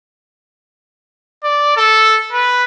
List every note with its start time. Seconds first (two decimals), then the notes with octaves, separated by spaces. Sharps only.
1.44 D5
1.77 A4
2.33 B4